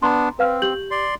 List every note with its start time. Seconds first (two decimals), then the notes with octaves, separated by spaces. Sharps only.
0.03 B3 D4 A#5 C6
0.39 C4 B4 F5 F6
0.62 G4 G6 F#7
0.91 D5 C6